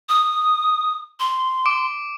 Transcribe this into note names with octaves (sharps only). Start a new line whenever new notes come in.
D#6
C6
D6 D7